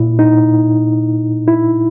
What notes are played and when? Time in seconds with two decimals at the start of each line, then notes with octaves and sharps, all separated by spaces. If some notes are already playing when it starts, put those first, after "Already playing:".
Already playing: A#2 E4
0.19 D#4
1.48 E4